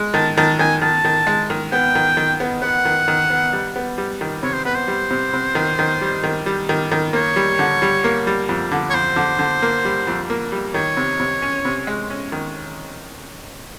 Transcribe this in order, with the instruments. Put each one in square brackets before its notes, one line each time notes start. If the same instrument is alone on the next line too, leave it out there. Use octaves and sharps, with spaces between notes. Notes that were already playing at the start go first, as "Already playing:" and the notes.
Already playing: [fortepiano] G#3
[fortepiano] D#3 [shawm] A5
[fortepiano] D#3 [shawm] A5
[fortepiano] D#3 [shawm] G#5
[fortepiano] D#3 [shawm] A5
[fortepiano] D#3
G#3
D#3
[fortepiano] B3 [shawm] G5
[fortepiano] D#3
D#3
B3
[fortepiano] B3 [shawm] F#5
[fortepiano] D#3
D#3
B3
G3
B3
G3
D#3
[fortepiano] C3 [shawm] C#5
[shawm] C5
[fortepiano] B3 [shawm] B4
[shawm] C5
[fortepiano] G3
C3
C3
D#3
D#3
G3
D#3
G3
D#3
D#3
[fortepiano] A#3 [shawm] C#5
[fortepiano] G3
D3
G3
A#3
G3
F2
D3
[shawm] C#5
[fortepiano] F2 [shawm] C5
[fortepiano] D3
D3
A#3
G3
F2
A#3
G3
[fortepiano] D#3 [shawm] C#5
[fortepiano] C3
C3
C#4
C3
G#3
C#4
D#3